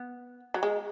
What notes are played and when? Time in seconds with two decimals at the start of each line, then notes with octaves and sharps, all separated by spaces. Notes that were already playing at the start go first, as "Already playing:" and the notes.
Already playing: B3
0.54 F#3
0.63 G#3